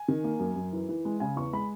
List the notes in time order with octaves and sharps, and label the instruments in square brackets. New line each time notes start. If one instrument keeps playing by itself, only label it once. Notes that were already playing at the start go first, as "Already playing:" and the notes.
Already playing: [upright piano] G#5
D#3
A#3
F#2
F#2
E3
E3
G#3
C#3 G#5
E2 C#6
G#3 B5